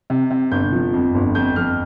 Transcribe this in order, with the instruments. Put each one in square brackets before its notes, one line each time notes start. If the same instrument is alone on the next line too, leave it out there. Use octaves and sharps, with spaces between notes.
[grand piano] C3
C3
G1 G6
F3
F2
G1
F2 G6
F2 F6